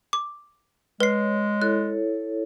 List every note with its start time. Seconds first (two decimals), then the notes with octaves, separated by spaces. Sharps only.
0.13 D6
1.00 G#3 B4 C#5 C7
1.62 E4 A4 C#5 F#6